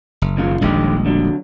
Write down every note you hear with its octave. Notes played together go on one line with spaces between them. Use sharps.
F#1
D#2 C#3 F4
D#1 A#1 D3 D#3 G#3 G4
D3 F#3